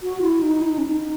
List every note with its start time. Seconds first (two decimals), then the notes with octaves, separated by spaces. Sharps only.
0.03 F#4
0.22 E4
0.42 D#4
0.62 E4
0.69 D#4
0.78 C#4
0.86 D#4